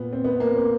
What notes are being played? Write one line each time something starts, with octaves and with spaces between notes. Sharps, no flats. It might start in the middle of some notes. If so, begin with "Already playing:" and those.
Already playing: A#2 B3
C4
B3
A#3
C4